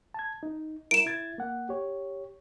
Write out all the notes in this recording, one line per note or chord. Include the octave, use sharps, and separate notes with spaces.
A5 G#6
D#4
E4 A#4 D7 E7
E4 G#6 A6
A#3 F#5
G4 C#5